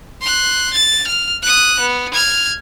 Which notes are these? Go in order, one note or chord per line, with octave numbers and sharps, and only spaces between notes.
C6 F#6
A6
F6
D#6 F#6
B3
F6 G#6